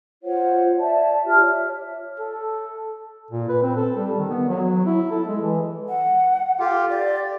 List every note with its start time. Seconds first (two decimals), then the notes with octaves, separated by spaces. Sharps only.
0.23 F4 C5 C#5 F#5
0.78 D5 E5 A5
1.25 F4 G4 F6
1.41 C#5 E5
2.20 A4
3.31 A#2
3.49 B4
3.62 C4
3.76 A4
3.97 G3
4.19 D#3
4.30 B3
4.48 F#3
4.86 E4
5.11 A4
5.28 G#3
5.42 E3
5.88 F#5
6.60 F4 G4 A4
6.89 G4 D5